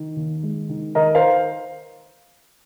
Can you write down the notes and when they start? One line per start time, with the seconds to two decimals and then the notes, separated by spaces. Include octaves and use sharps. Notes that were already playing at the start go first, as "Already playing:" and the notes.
Already playing: D#3
0.16 D#2
0.43 G#3
0.69 D#3
0.95 D#2 A#4 D#5
1.15 C5 F5